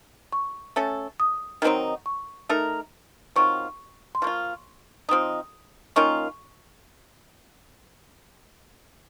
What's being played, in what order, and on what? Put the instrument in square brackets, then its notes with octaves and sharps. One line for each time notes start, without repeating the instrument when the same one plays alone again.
[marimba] C#6
[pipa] A3 C#4 A4
[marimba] D#6
[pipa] D#3 F#3 C4 D#4
[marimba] C#6
[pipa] A3 D#4 A#4
[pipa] D#3 F#3 C4 F4 [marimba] C#6
[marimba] C6
[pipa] F3 A#3 F4 [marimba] C#6
[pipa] F3 C4 D#4 [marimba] D#6
[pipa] D#3 A#3 C#4 F4 [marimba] C#6